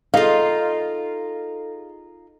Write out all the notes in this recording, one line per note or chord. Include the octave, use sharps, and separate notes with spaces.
D#4 F4 G#4 A4 F5